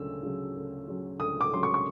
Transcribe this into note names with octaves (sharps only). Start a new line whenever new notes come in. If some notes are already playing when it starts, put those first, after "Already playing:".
Already playing: D2 C#3 F#3 E6
C#3 F#3
D2
C#3 F#3
D2 D#6
D6
C#3 F#3 C6
C#6
C#6